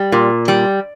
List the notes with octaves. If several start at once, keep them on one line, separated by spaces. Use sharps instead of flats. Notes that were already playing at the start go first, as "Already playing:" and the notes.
Already playing: G3
A#2
G3